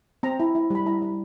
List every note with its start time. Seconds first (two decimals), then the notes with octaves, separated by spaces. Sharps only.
0.23 C4 A#5
0.40 E4
0.55 E4
0.70 G3 B5
0.86 E4 A#5
1.02 G3